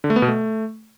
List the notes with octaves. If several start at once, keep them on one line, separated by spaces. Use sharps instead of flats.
D3
A3
B3
B2
A3